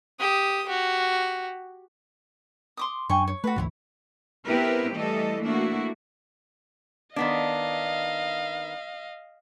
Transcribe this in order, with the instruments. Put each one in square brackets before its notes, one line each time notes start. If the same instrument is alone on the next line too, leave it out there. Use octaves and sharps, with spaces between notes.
[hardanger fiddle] G4 D#6
F#4 G4
[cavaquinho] C6 D6 D#6
[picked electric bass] F#2 D4 [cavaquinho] G5 G#5 C#6
[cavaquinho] C#5
[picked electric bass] A3 [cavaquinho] F#4 B4
[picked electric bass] G#1 D2 E3 [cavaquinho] E4 F4 C#5
[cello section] B3 C4 E4 G4 A#4 B4
E3 G3 A3 A4 D#5
A3 A#3 D4 E4 F#4
[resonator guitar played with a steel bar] D#3 B3 D4 [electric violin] D#5 F5